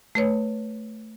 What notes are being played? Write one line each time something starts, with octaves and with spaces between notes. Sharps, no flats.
A3 B4 C#5